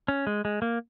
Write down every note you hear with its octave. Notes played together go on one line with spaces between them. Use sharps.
C#4
G#3
G#3
A#3